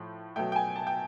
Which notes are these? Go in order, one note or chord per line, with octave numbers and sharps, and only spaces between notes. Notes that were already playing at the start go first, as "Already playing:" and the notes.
Already playing: A2 F3 A3
B2 F#3 A3 G5
G5
G#5
A5
G5